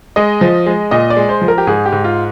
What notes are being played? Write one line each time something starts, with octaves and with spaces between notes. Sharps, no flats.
G#3 D#5
F3
G#3
A#2 D#5
D5
G#3
C5
F3
A#4
G4
G#2 G#4
G4
G#2
F4